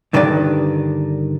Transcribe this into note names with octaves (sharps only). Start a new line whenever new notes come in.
G2 D3 D#3 G4 B4 D5